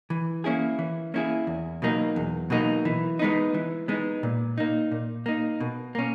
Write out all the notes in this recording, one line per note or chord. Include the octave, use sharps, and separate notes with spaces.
E3
A#3 C#4 E4 G#4
E3
A#3 C#4 E4 G#4
E2
B2 F#3 A#3 D#4
E2
B2 F#3 A#3 D#4
E3
G#3 B3 D#4
E3
G#3 B3 D#4
A#2
A#3 D#4
A#2
A#3 D#4
B2
A#3 C#4